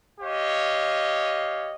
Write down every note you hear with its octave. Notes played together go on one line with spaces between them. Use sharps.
G4 C#5 D#5 F5